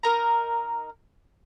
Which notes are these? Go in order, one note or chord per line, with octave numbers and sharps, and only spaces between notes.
D#4 A#4 A#5